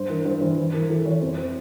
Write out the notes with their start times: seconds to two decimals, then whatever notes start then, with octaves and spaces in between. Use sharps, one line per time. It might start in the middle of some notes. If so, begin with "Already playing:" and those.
Already playing: G2 C5
0.09 E3 A#4
0.25 G2 C5
0.41 E3 C5
0.58 E3 B4
0.73 E3 A#4
0.89 E3 A4
1.06 E3 C#5
1.21 F2 C5
1.37 C5